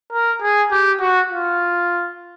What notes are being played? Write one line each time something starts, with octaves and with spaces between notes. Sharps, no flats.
A#4
G#4
G4
F#4
F4